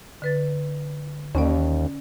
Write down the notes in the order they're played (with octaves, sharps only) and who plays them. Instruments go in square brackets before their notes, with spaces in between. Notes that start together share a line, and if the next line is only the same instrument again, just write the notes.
[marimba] D3 B4 A6
[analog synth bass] D#2 [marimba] C#4 D5